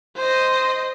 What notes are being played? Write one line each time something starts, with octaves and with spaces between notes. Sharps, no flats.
C5 D#5